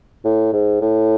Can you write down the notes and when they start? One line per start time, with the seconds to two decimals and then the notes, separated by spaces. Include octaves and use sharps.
0.25 A2
0.53 G#2
0.81 A2